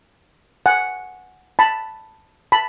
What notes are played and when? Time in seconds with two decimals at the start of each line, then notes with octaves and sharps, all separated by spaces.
0.66 F#5 G#5
1.59 A5 B5
2.52 A5 B5